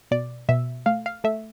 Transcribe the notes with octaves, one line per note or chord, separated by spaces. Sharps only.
B2 D5
B2 E5
A3 F5
F5
A3 E5